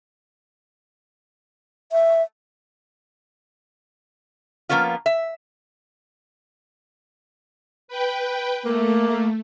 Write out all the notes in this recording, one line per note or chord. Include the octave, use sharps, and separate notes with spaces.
E5
F3 A#3 B3 C#4 F4
E5
B4 G5
A3 A#3